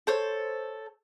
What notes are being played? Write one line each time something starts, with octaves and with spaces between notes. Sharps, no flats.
A4 C5 C#5